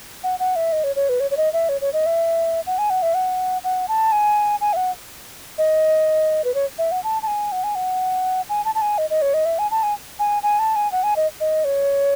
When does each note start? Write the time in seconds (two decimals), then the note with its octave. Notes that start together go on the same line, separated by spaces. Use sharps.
0.24 F#5
0.39 F#5
0.56 E5
0.72 D#5
0.84 C#5
0.96 C#5
1.09 B4
1.20 C#5
1.31 C#5
1.37 D#5
1.53 E5
1.69 C#5
1.81 C#5
1.93 D#5
2.06 E5
2.67 F#5
2.78 G#5
2.90 F#5
3.02 E5
3.14 F#5
3.64 F#5
3.88 A5
4.12 G#5
4.61 G#5
4.73 E5
4.76 F#5
5.58 D#5
6.44 B4
6.55 C#5
6.78 E5
6.92 F#5
7.04 A5
7.23 A5
7.27 G#5
7.52 F#5
7.64 G#5
7.75 F#5
8.49 G#5
8.65 A5
8.75 A5
8.82 G#5
8.98 D#5
9.10 D#5
9.22 C#5
9.34 D#5
9.45 E5
9.59 G#5
9.71 A5
9.83 G#5
10.19 G#5
10.43 G#5
10.59 A5
10.76 G#5
10.92 F#5
11.03 G#5
11.16 D#5
11.40 D#5
11.64 C#5